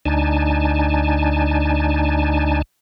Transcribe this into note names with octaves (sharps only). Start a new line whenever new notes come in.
D2 D4 D#4 G#5 A5